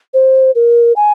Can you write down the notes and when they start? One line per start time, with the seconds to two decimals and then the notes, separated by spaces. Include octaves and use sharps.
0.14 C5
0.55 A#4
0.96 G#5